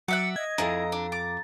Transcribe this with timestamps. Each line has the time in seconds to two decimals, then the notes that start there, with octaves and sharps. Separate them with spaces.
0.08 F#3 D5 E5 F#5 C#7
0.36 D#5 G#6
0.58 F2 E4 G#4 A#5
0.92 D4
1.12 D6 A6